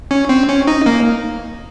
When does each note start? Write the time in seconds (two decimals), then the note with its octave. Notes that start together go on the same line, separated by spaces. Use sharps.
0.11 C#4
0.29 C4
0.48 C#4
0.67 D#4
0.86 A#3